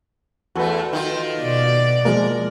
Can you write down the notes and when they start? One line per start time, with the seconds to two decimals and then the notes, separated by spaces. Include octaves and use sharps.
0.56 E2 A3 F#4 A4 B4
0.93 D#3 F4
1.41 B2 D5
2.05 F3 G#3 A#3 A#4